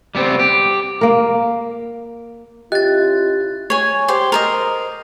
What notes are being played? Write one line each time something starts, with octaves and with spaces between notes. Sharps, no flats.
G3 B3 C4
G4
A#3 A#4
C#4 E4 F4 G4 D#5 F#6 A6
C#5 G#5
G4 C5
A#4 C5 D#5